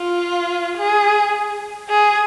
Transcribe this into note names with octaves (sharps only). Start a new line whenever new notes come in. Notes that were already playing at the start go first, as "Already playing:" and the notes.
Already playing: F4
G#4
G#4